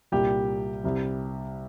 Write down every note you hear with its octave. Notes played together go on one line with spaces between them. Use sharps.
C2 A#2 G3 G4
C2 C3 G3